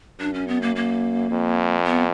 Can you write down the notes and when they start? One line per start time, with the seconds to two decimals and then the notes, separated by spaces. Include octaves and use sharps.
0.20 F#2 D4
0.34 C#4
0.48 B3
0.62 A#3
0.76 A#3
1.31 F2
1.86 B3